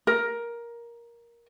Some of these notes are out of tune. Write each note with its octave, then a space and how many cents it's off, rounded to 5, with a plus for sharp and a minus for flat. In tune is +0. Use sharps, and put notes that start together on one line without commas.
A#4 +10